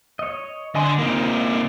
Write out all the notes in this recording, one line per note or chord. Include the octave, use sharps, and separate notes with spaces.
C#5 D#5
D3 D#5 G#5 C6
C3 G#3 A#3 D#4 F4